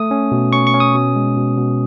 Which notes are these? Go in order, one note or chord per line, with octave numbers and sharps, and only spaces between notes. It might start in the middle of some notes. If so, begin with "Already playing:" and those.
Already playing: A3 D#6
C#4
B2
C#4 C#6
C#6
C#4
D#6
B2
G#3
B2
B2